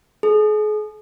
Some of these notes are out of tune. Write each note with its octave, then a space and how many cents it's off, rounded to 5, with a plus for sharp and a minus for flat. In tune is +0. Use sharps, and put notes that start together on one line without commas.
G#4 +40